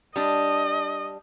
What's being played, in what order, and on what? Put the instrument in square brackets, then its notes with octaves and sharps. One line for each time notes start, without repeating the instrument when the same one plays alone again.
[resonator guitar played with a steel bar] G3 D4 [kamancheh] D#5